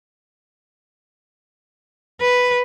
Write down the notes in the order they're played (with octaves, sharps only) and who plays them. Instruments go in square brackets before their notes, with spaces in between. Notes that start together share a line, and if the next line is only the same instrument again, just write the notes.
[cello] B4